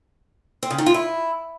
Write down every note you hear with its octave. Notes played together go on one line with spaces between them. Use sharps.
C4
C#3
D#3
F4
E4